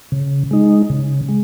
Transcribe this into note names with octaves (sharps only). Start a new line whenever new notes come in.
C#3
G#3 D#4
C#3
G#3